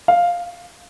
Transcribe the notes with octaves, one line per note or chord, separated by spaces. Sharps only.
F5